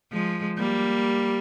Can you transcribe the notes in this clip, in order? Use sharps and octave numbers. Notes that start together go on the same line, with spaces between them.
F3 G#3
G3 A#3